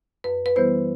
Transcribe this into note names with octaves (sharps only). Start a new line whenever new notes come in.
F#2 B4
B4
E3 G3 B3 E4 C5